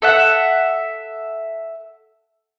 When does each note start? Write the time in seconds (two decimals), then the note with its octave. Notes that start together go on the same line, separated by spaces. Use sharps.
0.02 A4 E5 F#5